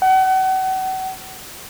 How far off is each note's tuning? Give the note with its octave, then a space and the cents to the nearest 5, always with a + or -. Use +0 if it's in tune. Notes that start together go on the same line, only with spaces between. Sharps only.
F#5 +35